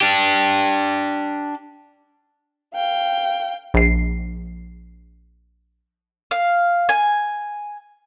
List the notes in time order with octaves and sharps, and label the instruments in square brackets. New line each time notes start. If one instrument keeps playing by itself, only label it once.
[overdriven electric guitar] D4 G4
[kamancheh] F5 G5
[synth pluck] A#1 C7
[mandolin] F5
G#5